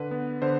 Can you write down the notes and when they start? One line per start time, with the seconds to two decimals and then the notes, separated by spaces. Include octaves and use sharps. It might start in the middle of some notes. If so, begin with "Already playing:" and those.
Already playing: D3 B4
0.11 B3
0.42 D3 C5